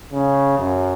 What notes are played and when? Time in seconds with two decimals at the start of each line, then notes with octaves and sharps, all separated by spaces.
0.13 C#3
0.59 F#2